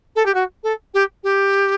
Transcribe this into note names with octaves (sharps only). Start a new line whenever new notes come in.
A4
G4
F#4
A4
G4
G4